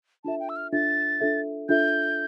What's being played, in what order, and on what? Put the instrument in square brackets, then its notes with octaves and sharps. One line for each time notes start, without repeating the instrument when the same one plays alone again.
[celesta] D4 F4 A4 E5 [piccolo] A5
[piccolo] G5
E6
F6
[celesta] D4 F4 A4 E5 [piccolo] A6
[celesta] D4 F4 A4 E5
[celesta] D4 F4 A4 E5 [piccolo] G6